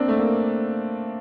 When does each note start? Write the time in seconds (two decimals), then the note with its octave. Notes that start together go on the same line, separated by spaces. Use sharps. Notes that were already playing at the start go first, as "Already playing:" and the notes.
Already playing: A#3 C4 D4
0.08 A3
0.19 A#3